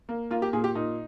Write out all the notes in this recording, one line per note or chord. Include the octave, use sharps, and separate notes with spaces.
A#3
A#3 F4
G4
A#2 G#4
G4
A#2 D#4